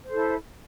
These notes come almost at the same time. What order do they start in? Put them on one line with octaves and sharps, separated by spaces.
C5 A4 E4